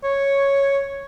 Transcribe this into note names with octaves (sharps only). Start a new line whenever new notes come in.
C#5